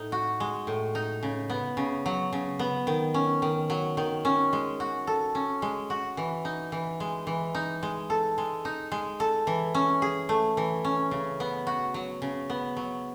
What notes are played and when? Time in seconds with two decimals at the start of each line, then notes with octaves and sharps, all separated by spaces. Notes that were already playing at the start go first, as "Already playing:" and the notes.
Already playing: A2 D#4
0.12 F#4
0.40 G#3
0.67 A2
0.95 D#4
1.23 C#3
1.50 B3
1.77 C#3
2.06 F#3
2.33 C#3
2.59 B3
2.87 D#3
3.14 C#4
3.42 D#3
3.70 F#3
3.97 D#3
4.25 C#4
4.53 G#3
4.80 F#4
5.07 A4
5.35 C#4
5.62 G#3
5.90 F#4
6.17 E3
6.45 D#4
6.72 E3
7.00 G#3
7.27 E3
7.55 D#4
7.83 G#3
8.10 A4
8.38 G#3
8.65 D#4
8.92 G#3
9.20 A4
9.47 E3
9.75 C#4
10.02 G#4
10.29 A3
10.57 E3
10.84 C#4
11.11 C#3
11.40 B3
11.67 F#4
11.94 F#3
12.22 C#3
12.50 B3
12.77 F#3